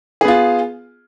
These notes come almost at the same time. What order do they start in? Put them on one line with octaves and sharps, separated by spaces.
G#4 B3 F4